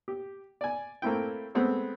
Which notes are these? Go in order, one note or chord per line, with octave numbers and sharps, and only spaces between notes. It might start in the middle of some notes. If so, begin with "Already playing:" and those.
G4
D5 G#5
A3 A#3 C4 E4 G5
G#3 A3 B3 C4